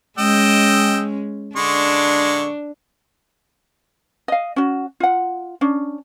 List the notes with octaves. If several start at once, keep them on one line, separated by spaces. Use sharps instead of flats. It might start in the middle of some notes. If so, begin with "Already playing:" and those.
G#3 C#4 D#5 G5 E6
D3 G#3 D4 C#6
D#5 F5
C#4 F#4
F4 F#5
C#4 D4